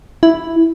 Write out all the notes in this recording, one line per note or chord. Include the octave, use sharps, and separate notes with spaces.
E4